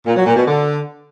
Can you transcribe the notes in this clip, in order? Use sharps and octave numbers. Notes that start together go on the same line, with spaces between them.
A#2
F#3
A#2
B2
D3